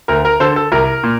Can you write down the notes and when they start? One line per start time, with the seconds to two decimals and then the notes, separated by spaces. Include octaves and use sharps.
0.08 D2 A#4
0.25 A#4
0.40 D3 A4 C5
0.56 A4
0.72 C2 A#4
1.03 A#2